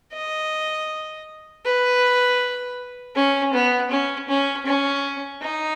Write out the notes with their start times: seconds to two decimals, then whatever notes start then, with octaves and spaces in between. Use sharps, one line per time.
0.13 D#5
1.65 B4
3.16 C#4
3.54 B3
3.91 C#4
4.29 C#4
4.66 C#4
5.42 D#4